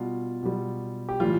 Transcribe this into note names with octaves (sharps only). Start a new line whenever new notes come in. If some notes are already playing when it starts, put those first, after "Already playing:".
Already playing: B2 G3 F4
B2 G3
G4
A2 E3 G3 F4